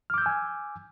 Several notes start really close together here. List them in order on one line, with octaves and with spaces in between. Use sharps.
F6 D6 G6 E6 G#5